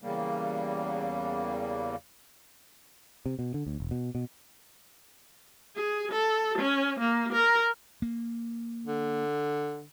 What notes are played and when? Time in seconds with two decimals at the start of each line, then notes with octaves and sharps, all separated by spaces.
0.02 E2 C#3 G3 A#3
3.26 C3
3.39 B2
3.54 D3
3.67 D2
3.80 E1
3.91 B2
4.15 B2
5.76 G#4
6.11 A4
6.58 C#4
7.00 A#3
7.32 A#4
8.02 A#3
8.86 D3